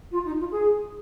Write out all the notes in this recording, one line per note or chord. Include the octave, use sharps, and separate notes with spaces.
F4
D#4
F4
G#4